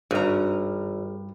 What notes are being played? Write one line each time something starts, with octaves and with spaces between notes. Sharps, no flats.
G#1 G2 A#5